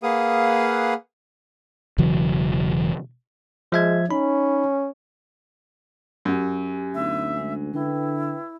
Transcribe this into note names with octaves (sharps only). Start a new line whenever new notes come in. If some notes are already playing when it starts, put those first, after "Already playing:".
A#3 G#4 B4 F5 F#5 D#6
E1 C#3 E3 F#3
F3 G#3 E5 G#6
C#4 D#4 B5
F#2 G4 G#5
D2 B3 C4 D#4 E5
G#3 D4
D3 E4 B4 G5